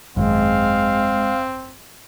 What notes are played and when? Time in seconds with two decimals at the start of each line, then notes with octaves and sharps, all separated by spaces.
0.17 G#1 F#2 G#3 C4 F5